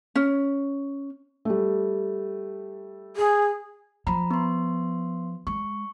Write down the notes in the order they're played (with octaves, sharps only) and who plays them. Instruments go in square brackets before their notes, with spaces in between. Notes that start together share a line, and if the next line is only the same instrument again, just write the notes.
[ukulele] C#4
[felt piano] G3 A3
[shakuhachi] G#4
[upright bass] F3 [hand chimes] A#5 B5
[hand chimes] B3 C6
[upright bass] G#3 [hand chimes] C#6